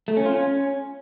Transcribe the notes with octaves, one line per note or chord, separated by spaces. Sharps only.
A3
C#4
F4
C#4